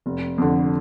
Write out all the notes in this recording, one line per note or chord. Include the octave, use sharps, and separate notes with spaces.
F1
F2 D3